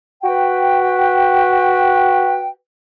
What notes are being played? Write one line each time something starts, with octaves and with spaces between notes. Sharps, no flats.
F#4 B4 G5